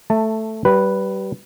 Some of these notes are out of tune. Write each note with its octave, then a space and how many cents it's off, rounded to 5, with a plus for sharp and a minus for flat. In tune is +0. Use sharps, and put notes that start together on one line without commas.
A3 +0 A5 +15
G3 -25 B4 +0